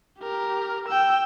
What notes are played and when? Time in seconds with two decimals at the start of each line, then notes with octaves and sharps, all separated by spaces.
0.20 G4 A#4
0.88 G5 E6